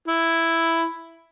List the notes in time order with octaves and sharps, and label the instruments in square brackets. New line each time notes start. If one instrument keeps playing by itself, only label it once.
[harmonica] E4